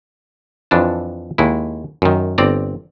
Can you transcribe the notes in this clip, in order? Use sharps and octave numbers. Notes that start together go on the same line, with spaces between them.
F2 E3 D4 A5
D#2 G#3 E4
F#2 D#3
G1 C4 D5 A#5